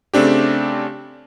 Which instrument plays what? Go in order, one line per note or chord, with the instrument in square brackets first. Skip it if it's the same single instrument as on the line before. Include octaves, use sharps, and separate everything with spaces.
[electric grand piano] C#3 A3 C4 D4 G4